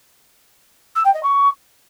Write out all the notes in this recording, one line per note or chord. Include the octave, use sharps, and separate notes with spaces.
E6
G5
D#5
C#6